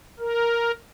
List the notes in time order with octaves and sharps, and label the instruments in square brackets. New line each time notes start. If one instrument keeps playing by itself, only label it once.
[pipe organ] A#4